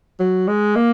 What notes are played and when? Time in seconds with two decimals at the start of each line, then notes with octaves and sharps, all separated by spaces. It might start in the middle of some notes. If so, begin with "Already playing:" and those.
0.20 F#3
0.48 G#3
0.76 A#3